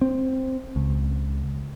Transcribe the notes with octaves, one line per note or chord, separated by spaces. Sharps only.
C4
C#2